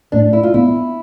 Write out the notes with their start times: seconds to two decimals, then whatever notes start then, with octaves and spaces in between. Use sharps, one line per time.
0.12 A2 D4
0.33 E4
0.43 F4
0.54 B3 E4